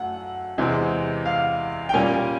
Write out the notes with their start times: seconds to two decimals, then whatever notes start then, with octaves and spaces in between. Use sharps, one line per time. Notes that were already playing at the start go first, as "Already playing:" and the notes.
Already playing: F#2 A3 F#5
0.58 E2 C3 E3 G#3 C4
1.25 F5
1.89 G5
1.94 A#2 G3 A#3 C#4 G#5